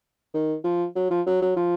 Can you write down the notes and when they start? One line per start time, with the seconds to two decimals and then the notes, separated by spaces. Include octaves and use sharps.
0.34 D#3
0.64 F3
0.96 F#3
1.10 F3
1.26 F#3
1.42 F#3
1.56 F3